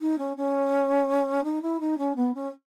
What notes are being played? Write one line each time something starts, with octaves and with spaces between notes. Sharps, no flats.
D#4
C#4
C#4
D#4
E4
D#4
C#4
B3
C#4